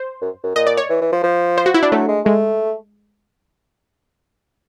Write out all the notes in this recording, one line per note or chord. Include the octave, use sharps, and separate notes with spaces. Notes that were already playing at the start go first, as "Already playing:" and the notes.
Already playing: C5
F#2
F#2
A#2 D#5
D5
C#5
E3
E3
F3
F3
C5
F#4
E4
D4
F#3 A3
G#3
G#3 A3